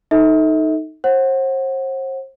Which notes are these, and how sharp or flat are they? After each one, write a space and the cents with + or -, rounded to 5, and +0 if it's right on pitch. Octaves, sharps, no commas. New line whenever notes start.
D#4 +0 A4 +0 E5 -40
C5 +40 F#5 +0